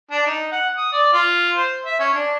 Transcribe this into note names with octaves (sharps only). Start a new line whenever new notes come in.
D4
D#4
F#5
D#6
D5
F4
C5
E5
C#4
D4